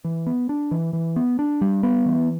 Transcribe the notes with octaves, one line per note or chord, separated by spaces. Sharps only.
E3
B3
D4
E3
E3
B3
D4
G3
B3
E3